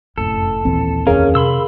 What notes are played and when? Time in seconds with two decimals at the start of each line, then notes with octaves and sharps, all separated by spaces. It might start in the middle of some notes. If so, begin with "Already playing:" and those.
0.18 F1 F#2 A2 C4 A4
0.65 A#1 D#2 E3 C4
1.07 F2 F#3 C#4 G#4 A#4 F5
1.35 C3 B5 C6 E6